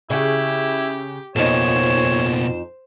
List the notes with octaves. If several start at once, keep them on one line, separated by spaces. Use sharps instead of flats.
C#3 E4 G4
F2 B2 A#3 D#4 C5 C#5 E7